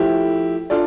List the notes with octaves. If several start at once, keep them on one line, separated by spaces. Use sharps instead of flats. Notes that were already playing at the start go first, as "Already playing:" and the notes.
Already playing: F3 A3 E4 G4
D4 F4 A4 D5